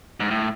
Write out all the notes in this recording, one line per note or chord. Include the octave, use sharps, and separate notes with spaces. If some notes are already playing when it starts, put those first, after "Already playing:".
G#2
A2